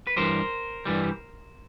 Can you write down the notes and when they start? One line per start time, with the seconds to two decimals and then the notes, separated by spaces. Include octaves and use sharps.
0.07 B4
0.16 G2 E3 G3 A#4 C5
0.85 G2 E3 G3